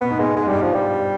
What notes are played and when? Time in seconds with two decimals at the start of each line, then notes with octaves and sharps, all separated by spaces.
0.01 B2 B3
0.10 G#2
0.19 B2 G#3
0.36 G#2 G#3
0.47 G2 G3
0.55 G#2
0.62 F3
0.74 G3